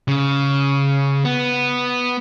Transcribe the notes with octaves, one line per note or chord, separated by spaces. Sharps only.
C#3
B3